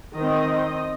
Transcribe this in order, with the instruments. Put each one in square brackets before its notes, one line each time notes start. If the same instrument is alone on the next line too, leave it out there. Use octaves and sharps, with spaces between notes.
[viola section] D#3 C4 D#5